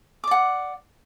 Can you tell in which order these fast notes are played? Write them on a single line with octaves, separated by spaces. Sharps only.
D6 D5 F#5